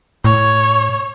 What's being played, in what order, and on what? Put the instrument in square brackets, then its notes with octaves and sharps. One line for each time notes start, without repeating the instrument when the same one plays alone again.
[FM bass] A2 [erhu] C#5